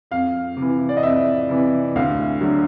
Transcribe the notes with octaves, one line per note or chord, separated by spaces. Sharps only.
F2 F5
C3
E3
D5
D#5
F2 E5
C3 E3
D2 F5
D3 F#3